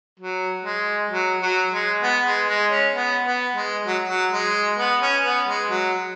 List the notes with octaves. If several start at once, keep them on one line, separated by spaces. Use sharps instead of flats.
F#3
G#3
F#3
F#3
G#3
B3
G#3
G#3
C#4
B3
B3
G#3
F#3
F#3
G#3
B3
C#4
B3
G#3
F#3